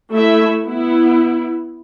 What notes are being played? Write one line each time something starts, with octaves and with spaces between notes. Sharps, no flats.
A3 E4 E5
B3 E4